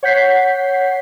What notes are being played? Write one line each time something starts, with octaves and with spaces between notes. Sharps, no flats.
C#5 F#5 G6 B6 C7